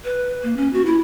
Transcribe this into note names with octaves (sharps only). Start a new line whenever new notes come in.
B4
A#3
C#4
F#4
E4